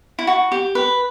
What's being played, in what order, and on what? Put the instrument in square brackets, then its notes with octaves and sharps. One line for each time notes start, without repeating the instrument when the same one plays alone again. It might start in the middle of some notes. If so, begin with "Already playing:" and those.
[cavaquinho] E4
F#4
G4
B4